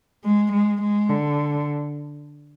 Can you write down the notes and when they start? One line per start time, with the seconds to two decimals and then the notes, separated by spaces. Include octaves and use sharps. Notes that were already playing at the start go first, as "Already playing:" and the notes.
0.24 G#3
0.52 G#3
0.82 G#3
1.10 D3